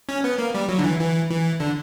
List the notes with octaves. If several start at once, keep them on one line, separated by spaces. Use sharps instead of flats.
C#4
B3
A#3
G3
F#3
D3
E3
E3
E3
D3